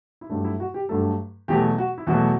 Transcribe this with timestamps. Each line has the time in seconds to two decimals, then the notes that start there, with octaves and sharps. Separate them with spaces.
0.21 E4
0.30 G2 F#3 A3 D4
0.44 E4
0.60 F#4
0.74 G4
0.89 G2 F#3 A3 A4
1.48 E2 B2 F#3 A3 G4
1.78 F#4
1.98 E4
2.07 E2 B2 F#3 A3 F#4